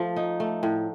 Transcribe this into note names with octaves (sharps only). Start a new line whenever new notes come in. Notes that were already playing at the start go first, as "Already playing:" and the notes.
Already playing: F3 A3
D#4
A3
A2